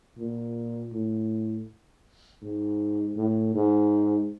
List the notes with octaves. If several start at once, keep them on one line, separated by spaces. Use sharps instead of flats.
A#2
A2
G#2
A2
G#2